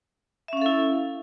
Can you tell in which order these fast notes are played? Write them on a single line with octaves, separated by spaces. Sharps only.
E5 C#4 F5 A4 E4